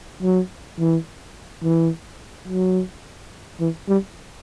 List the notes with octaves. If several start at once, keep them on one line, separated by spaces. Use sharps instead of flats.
F#3
E3
E3
F#3
E3
G3